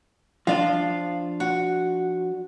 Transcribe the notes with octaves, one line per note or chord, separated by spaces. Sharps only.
F3 D4 F4 F5
F#4